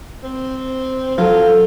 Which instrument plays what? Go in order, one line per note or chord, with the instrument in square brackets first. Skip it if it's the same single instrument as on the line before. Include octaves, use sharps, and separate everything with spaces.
[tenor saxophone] C4
[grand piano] F#3 [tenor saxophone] F4 [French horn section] A4